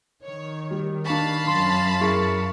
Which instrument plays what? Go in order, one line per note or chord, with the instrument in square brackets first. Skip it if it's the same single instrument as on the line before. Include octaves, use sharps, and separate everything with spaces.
[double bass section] D#3 [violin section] C#5
[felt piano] G3
[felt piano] D4 C#6 [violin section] F5 A5 B5
[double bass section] F#2 [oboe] C6
[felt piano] E4 G#4 A#4 [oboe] C#6